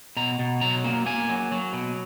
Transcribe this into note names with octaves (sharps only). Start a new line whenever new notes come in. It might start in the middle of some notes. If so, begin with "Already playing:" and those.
B2 A#5
B2
F#3 A#5
A#3
A#3 G#5
F#3
F#3
B2